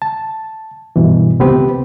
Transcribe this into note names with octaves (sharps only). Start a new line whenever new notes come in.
A5
G2 B2 E3
C#2 C3 B3 C4 G4 B4